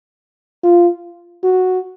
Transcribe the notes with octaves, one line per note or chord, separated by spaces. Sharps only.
F4
F#4